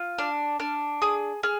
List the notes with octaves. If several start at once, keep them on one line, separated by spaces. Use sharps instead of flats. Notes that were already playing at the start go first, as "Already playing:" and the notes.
Already playing: F4
D4 F6
D4 F6
G#4 D#6
G#4 F6